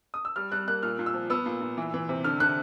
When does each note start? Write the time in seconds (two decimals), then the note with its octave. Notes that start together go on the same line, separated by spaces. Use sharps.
0.14 D#6
0.25 E6
0.36 G3 F6
0.52 G3 F#6
0.68 A#3 F#6
0.83 A#2 F6
0.99 A#2
1.06 E6
1.14 F3
1.30 B3 E6
1.46 A#2
1.61 A#2
1.77 E3
1.94 E3
2.09 C3
2.24 D3 F6
2.40 D3 F#6